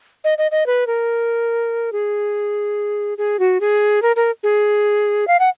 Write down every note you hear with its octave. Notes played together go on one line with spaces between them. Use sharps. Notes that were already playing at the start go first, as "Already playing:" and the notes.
D#5
D#5
D#5
B4
A#4
G#4
G#4
F#4
G#4
A#4
A#4
G#4
F5
F#5